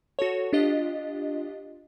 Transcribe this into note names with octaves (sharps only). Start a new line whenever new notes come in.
F#4 A4 C#5
D4 F4 G4 D#5